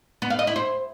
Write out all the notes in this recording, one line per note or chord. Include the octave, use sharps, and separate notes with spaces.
B3
F5
D#5
E4
C5